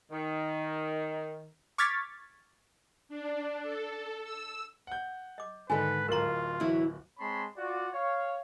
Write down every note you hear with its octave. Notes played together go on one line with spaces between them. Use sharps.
D#3
C#6 D6 F6 G#6 A6 B6
D4
A4
E6
F#5 G6
D#5 D6
G#2 D3 D#3 A4 B4 G#5
D1 F4 A#4 A#5 F#7
E3 F#3 E4
G#3 C4 C#5 A5 B5 C6
F4 F#4 D5
C#5 F5